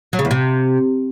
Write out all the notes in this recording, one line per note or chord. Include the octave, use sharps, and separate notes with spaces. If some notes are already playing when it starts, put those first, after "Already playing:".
F#3
C#3
E2
C3